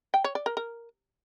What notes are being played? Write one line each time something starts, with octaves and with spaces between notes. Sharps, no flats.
G5
C#5
D5
A#4
A#4